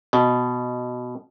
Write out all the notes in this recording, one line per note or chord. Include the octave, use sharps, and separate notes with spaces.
B2